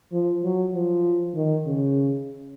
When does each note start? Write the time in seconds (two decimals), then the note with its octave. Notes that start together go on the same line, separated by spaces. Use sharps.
0.12 F3
0.43 F#3
0.73 F3
1.35 D#3
1.66 C#3